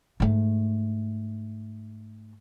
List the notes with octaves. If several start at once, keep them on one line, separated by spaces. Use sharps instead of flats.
G#2 A3